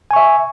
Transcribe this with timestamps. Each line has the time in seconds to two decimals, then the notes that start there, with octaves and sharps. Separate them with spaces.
0.11 G#5
0.13 C#6
0.16 E5